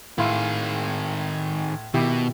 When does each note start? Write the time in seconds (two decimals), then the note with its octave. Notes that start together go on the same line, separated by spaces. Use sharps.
0.18 A2 D#3 E4 G#4 F5 C6
1.94 B2 D#3 E4 G4